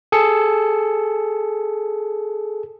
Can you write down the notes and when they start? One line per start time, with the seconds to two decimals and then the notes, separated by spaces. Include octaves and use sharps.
0.12 G#4 A4 C#7